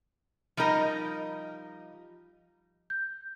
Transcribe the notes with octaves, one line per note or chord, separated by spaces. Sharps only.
F3 G3 D#4 A#4 D#5
G6